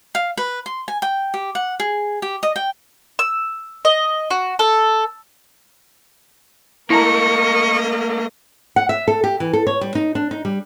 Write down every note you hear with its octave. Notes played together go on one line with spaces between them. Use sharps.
F5
B4
C6
G#5
G5
G4
F#5
G#4
G4
D#5
G5
E6
D#5
F#4
A4
A3 A#3 E4 A#4 D#5 A5 A#5 C#6
F#5
E5
A4
G4
E3
A4
C#5
G3
D#4
D4
D#4
G3